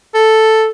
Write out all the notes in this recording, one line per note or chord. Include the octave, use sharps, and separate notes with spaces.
A4